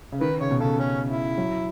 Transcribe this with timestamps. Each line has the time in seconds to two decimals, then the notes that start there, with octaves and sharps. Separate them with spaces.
0.12 C#3
0.21 D#3 B4
0.41 C#3 C#5
0.51 B2
0.60 C#3 A4
0.79 C#4
1.09 E4
1.38 F#3